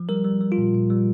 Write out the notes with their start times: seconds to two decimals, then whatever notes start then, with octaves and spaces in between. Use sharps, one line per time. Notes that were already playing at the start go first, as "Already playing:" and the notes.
Already playing: F3
0.09 G3 A#4
0.24 G3
0.41 G3
0.52 F4
0.58 A#2
0.75 A#2
0.90 G3